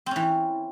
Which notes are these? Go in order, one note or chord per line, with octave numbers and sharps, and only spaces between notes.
E3 C4 C#4